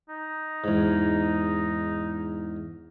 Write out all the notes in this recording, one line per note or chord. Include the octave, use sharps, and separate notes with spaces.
D#4
E2 G#2